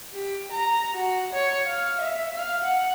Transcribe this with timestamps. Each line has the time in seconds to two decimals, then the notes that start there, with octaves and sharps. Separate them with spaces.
0.13 G4
0.52 A#5
0.94 F#4
1.33 C#5
1.67 F5
2.01 E5
2.35 F5
2.64 F#5